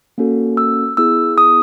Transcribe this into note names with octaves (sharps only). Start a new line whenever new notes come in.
A#3 C#4 F#4 A4
E6
B3 E4 G#4 E6
D#6